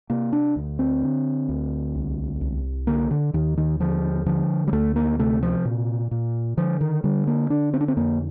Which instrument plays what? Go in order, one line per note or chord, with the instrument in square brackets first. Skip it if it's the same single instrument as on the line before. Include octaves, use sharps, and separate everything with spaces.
[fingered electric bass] C3 A#3
D4
D2
C4
D3
D2
C2
C2
D3 A#3
D3
D#2 D#3
D#3
D3 F3
D3 F3
G3
D2 A3
A#3
C3 A3
F3
A#2
A#2
D3 F3
D#3
D3 G3
A#3
D3 D4
C4
D4
C4
F2 A#3